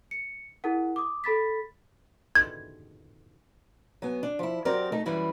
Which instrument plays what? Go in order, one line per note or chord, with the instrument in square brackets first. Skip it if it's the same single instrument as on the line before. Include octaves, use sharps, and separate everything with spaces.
[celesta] C#7
E4 G#4 A#4 F#5
D6 D#6
A4 B5 A6 B6
[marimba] G#6
[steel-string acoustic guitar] F#3 B3 G#5
D4
F3 E4
F#3 C4 G4 A#4 D5
A3 D#4
F#2 E3 G3 E4